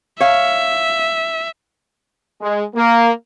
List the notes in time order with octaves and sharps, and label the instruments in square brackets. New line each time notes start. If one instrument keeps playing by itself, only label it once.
[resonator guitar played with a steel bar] C#5 F5 [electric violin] E5
[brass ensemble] G#3
A#3